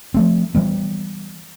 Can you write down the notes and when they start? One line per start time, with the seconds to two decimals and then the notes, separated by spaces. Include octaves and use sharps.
0.14 F3 A3 C4
0.55 E3 G3 B3